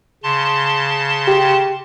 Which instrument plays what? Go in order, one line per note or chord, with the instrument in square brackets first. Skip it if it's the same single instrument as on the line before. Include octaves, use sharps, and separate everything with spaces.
[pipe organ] C#3 A5 C6
[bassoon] G4